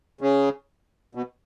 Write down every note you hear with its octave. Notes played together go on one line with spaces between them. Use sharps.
C#3
B2